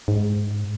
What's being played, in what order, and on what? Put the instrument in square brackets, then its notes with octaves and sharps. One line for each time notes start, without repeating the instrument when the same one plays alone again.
[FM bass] G#2